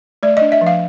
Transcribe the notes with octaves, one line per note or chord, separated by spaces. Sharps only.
A3 D5
D#5
D4
E5
F3
F5